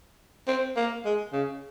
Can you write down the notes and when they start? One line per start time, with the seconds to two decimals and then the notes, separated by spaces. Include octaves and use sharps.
0.48 C4
0.77 A#3
1.05 G#3
1.33 C#3